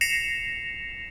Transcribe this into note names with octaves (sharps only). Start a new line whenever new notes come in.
A#6 C7 C#7 E7 F7